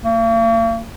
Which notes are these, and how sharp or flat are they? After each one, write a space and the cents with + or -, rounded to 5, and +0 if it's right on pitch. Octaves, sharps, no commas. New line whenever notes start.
A#3 -45